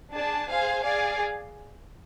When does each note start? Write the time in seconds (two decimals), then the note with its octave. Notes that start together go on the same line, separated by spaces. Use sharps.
0.12 D4 G#4 D5 A5
0.48 G#4 C5 F5 G#5
0.84 G#4 D5 F5 G#5